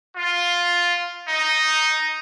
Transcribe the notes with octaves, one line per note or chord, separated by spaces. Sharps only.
F4
D#4